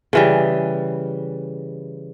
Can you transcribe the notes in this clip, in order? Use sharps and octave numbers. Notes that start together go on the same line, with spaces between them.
C#3 E3 G3